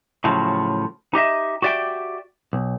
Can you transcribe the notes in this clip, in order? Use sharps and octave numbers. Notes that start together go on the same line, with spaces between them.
A2 C#3 F3 F#3
D#4 G4 D#5 E5
F#4 G4 D5 E5 G5
B1